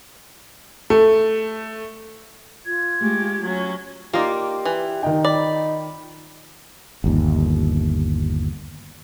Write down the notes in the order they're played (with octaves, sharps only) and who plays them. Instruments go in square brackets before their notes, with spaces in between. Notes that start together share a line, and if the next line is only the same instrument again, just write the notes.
[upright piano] A3
[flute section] F4 G#6
[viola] G#3 G4 [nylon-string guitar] A3 G#5
[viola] F#3 C#4
[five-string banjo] A#3 D#4 [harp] F4 D5 [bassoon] G4
[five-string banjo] E3
[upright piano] D#3 G5 [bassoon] D#4
[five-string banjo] D5 [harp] B5
[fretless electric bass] G1 D#2